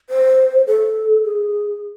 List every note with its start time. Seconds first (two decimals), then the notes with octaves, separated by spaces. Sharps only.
0.10 C5
0.67 A4
1.25 G#4